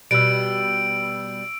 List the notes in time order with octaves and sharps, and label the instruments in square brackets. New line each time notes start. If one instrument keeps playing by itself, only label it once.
[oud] B2 G3 [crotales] E6 D7